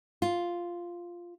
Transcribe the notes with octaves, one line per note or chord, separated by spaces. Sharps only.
F4